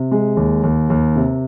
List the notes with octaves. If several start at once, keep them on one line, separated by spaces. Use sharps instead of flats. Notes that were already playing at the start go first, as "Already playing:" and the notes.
Already playing: C3
G#3
D#2
D#2
D#2
C3